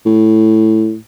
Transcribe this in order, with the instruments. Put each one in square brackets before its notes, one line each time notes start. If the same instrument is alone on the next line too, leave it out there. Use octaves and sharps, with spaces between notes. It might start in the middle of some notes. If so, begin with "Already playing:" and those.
[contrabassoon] A2